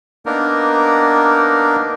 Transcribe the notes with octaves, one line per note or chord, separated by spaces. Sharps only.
A#3 B3 D4 D#4 A#4